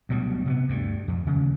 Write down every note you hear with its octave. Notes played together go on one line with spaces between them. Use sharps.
D2 B2 F#3 G3
C3 A#3 B3
D2 G2
F2
D#2 C#3